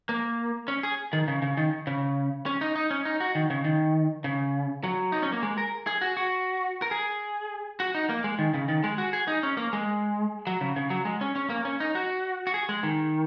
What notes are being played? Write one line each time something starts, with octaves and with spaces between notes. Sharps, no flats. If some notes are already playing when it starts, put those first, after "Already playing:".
A#3
C#4
G#4
D#3
C#3
C#3
D#3
C#3
C#4
D#4
D#4
C#4
D#4
F#4
D#3
C#3
D#3
C#3
F#3
D#4
C#4
A#3
G#3
A#4
G#4
F#4
F#4
A#4
G#4
F#4
D#4
A#3
G#3
D#3
C#3
D#3
G#3
F#4
G#4
D#4
C#4
A#3
G#3
F#3
C#3
C#3
F#3
G#3
C#4
C#4
A#3
C#4
D#4
F#4
F#4
G#4
G#3
D#3